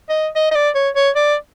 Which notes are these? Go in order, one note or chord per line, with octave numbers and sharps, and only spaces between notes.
D#5
D#5
D#5
D5
C#5
C#5
D5